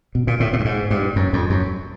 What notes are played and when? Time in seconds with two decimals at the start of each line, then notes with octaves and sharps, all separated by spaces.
0.15 B2
0.27 A#2
0.40 A2
0.53 A2
0.60 G2
0.65 G#2
0.91 G2
1.16 F#2
1.33 F2
1.50 F#2